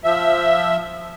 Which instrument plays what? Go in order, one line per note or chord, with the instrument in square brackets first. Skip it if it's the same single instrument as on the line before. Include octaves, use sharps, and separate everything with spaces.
[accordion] F3 E5